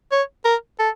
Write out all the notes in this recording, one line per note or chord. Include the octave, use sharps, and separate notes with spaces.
C#5
A#4
A4